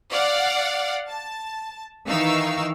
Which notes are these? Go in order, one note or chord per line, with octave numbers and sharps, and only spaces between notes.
D5 F5 F#5
A5
D#3 E3 D#4 F5 C#6 E6